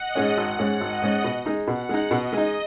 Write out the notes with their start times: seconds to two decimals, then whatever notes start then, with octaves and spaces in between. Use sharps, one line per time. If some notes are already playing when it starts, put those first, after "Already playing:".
Already playing: D#5 F#5
0.15 G#2 G#3 C#4
0.37 G#1 F#5
0.59 G#2 G#3 C#4
0.81 G#1 D#5
1.02 G#2 G#3 C#4
1.24 B2
1.46 G#3 D#4
1.67 B2 F#5
1.89 G#3 D#4
2.11 B2 D#5
2.33 G#3 D#4